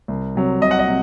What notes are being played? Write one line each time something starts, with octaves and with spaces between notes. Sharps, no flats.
C2
C3 F#3
C2 D#5
F#5
D#5
C3